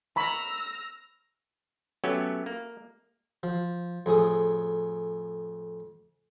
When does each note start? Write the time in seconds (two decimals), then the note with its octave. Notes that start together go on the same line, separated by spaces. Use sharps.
0.16 A#5 B5 C#6 E6 F6 A#6
2.04 F#3 A3 B3 C#4 G4
2.46 A#3
3.43 F3
4.06 F2 A2 G#4 D#6